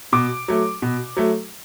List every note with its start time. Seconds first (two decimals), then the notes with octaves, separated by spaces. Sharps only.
0.12 B2 D6
0.48 F#3 A3
0.82 B2
1.17 F#3 A3